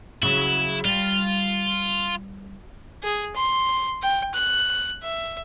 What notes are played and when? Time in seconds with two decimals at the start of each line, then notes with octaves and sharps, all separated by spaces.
0.23 C#3 F#3 E4
0.85 G3 F4
3.03 G#4
3.36 C6
4.02 G5
4.34 F#6
5.02 E5